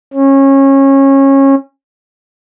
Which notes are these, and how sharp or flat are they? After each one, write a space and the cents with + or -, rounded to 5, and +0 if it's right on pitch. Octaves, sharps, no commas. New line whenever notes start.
C#4 -25